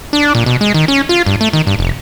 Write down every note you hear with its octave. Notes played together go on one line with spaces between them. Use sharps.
D4
A#2
B2
G#3
D#3
C#4
F4
G2
A3
D#3
G2
F1